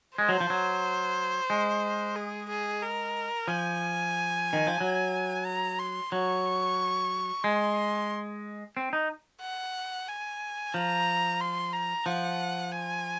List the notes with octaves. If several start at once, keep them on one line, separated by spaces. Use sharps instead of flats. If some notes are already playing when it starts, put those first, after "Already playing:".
G#3 C5
F#3
F3
F#3
G#3
G#4
G#4
A#4
F3 G#5
D#3
F3
F#3
A#5
C6
F#3 C#6
G#3 C6
C4
D#4
F#5
G#5
F3 A#5
C6
A#5
F3 F#5
G#5